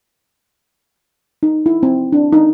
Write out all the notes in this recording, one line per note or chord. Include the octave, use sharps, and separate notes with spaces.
D#4
E4
C4
D4
D#4